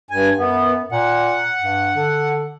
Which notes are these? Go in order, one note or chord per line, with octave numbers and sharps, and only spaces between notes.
G2 G#5
F#2 B3
A#2 F#5
G2
D3